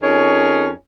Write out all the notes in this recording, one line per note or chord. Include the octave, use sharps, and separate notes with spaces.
F2 C#4 D#4 G#4 A#4 C#5